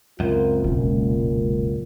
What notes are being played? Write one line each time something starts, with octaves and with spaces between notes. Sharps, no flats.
C#2 F#2 C4 F4 A#4
E1 A#2 C#4